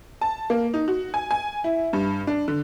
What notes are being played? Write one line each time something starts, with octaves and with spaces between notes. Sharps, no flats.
A5
A#3
D#4
F#4
G#5
G#5
E4
G2
D4
D3